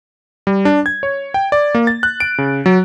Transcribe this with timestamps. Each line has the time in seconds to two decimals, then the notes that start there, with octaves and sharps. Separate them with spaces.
0.47 G3
0.65 D4
0.86 G#6
1.03 C#5
1.34 G5
1.52 D5
1.75 A#3
1.87 A6
2.03 F#6
2.20 D7
2.38 C#3
2.66 F#3